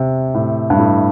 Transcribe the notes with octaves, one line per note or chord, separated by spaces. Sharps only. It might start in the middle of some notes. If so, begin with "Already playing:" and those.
Already playing: C3
A2
G2
A2